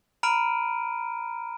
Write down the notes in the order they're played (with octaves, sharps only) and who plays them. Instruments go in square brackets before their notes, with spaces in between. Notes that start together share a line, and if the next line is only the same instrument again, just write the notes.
[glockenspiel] A#5 B5 F6 D7 D#7